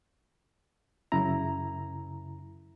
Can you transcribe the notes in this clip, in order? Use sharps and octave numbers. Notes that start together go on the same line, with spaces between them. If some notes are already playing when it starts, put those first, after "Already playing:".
F#2 C#3 E4 A#5